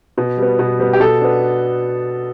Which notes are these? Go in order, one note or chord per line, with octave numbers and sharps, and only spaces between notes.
B2
G3 B3
B2
G3 B3
G4
B2 A4
B3 D4